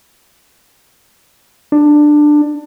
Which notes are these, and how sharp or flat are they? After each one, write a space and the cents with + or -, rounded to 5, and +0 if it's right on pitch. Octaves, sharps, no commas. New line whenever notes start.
D4 +15